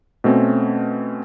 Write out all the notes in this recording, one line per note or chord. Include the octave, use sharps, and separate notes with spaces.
B2 A3 C4 C#4